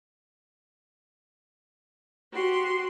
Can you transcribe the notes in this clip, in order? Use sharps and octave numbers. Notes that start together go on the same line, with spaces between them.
F#4 G4 C6